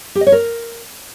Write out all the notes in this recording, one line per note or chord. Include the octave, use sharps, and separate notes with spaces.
G4
D#5
C#5
A#4